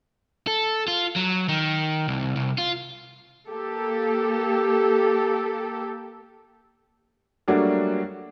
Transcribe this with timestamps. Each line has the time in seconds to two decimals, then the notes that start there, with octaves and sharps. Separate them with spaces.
0.47 A4
0.88 F4
1.16 F#3
1.49 D#3
2.08 C2
2.36 C2
2.58 F4
3.48 A#3 G4 A4
7.48 F#3 G3 A3 A#3 D4 F#4